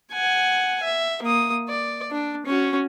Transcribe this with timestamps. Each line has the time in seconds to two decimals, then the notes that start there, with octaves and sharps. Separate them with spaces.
0.13 F#5 G#5
0.83 E5
1.22 A#3 D#6
1.69 D5
2.11 D4
2.46 C#4 F#4